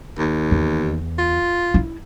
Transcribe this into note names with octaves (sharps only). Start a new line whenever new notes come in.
D#2
E2
F4
E4